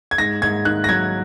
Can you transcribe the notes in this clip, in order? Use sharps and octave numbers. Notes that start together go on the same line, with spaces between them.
G#6
G#2 A#6
G#2 G#6
D#3 F#6
A#6
F#3 G#6